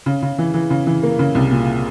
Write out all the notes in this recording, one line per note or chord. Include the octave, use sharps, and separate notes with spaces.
C#3
C#3
E3
E3
C#3
E3
A#3
C#3
C2
A#2